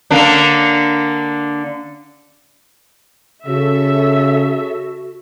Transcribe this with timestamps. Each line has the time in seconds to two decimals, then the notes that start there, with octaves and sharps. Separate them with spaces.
0.11 D3 A#3 D4
3.46 C#3 F#4 A4 E5